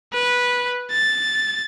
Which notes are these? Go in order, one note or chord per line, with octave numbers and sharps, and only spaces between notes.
B4
A6